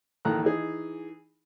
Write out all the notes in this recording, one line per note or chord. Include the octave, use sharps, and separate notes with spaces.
A#1 D#3 E3 A4 A#5 F#6
E3 D#4 G#4